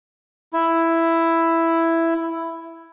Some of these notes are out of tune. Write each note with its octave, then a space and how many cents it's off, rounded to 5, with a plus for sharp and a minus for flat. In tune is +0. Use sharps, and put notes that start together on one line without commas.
E4 +5